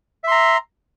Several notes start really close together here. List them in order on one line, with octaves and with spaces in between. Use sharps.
E5 C6 A#5